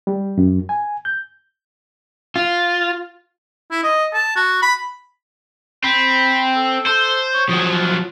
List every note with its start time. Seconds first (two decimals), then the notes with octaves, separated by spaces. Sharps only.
0.07 G3
0.38 F#2
0.69 G#5
1.05 G6
2.36 F4
3.71 E4
3.83 D#5
4.13 A5
4.36 F#4
4.62 B5
5.84 C4 B5
6.55 A4
6.86 A4 C5
7.34 C#5
7.49 F3 F#3 G#4
7.72 F4